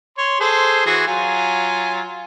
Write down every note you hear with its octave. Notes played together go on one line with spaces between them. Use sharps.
C#5 C6
G#4 A4 C5
E3 F#4 G#4
F#3 F4 G#5